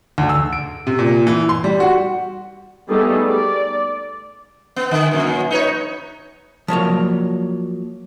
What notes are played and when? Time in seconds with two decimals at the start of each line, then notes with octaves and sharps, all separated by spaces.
0.18 D2
0.29 E6
0.53 D7
0.87 C3
0.99 A#2
1.27 E3
1.49 C6
1.64 G3
1.80 F#4
2.89 G3 A3 B3 D#4 G#4 A4
3.28 D5
4.76 B3
4.91 D3
5.11 F#2 A#2
5.50 D#4 B4 C#5
6.68 F3 F#3 A#3 C#5